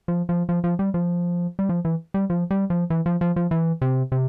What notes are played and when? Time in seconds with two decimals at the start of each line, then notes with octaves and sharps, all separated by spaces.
0.08 F3
0.29 F3
0.49 F3
0.64 F3
0.79 G3
0.94 F3
1.59 G3
1.69 F3
1.85 E3
2.14 G3
2.30 F3
2.51 G3
2.70 F3
2.90 E3
3.06 F3
3.21 F3
3.36 F3
3.51 E3
3.82 C3
4.12 C3